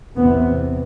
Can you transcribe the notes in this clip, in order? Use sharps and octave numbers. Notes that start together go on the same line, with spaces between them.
E2 C3 B3